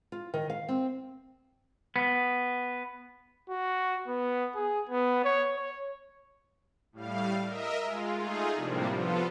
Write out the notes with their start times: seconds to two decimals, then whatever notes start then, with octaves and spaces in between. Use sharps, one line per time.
0.12 F4
0.34 D#3
0.50 F5
0.69 C4
1.96 B3
3.50 F#4
4.08 B3
4.55 G#4
4.89 B3
5.24 C#5
5.56 C#5
6.92 A2 G3 F5
7.46 A#4 D#5 E5
7.82 G#3 F4
8.15 A3 D#4 F4 G#4
8.54 A2 C3 F3 G3 A#3 D4
8.91 F3 B3 F4 A4